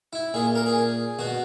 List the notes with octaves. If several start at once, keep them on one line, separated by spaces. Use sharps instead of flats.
E4
A#2 G#4
A#4
G#4
B2 F#4